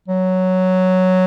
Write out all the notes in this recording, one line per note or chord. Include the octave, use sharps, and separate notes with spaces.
F#3